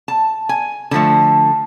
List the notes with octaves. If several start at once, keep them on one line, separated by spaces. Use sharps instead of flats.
A5
G#5
D3 F3 A3 A5